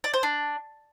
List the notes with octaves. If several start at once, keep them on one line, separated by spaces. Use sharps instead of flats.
D5
C5
D4